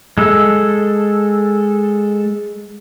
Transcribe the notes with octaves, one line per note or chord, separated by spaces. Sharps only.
G#3 A4